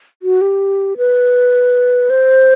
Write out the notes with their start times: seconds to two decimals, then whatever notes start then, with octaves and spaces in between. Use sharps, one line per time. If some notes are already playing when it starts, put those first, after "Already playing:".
0.23 F#4
0.41 G4
0.97 B4
2.10 C5